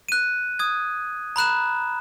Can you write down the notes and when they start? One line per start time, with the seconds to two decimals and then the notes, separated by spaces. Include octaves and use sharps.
0.09 F#6 D#7
0.59 D#6 G#6
1.36 A#5 B5 F#6 E7